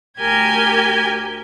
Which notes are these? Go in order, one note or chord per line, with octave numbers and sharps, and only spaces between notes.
D2 G4 A#4 G#5 G6 G#6